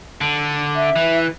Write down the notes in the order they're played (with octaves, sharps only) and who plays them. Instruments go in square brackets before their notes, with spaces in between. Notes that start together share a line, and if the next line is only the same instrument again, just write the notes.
[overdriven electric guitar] D3
[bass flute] E5
[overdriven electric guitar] E3